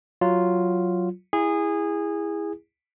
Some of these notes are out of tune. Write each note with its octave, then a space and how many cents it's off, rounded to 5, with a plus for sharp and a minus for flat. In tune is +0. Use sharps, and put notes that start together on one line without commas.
F#3 +0 F4 +0
E4 +0 G#4 -20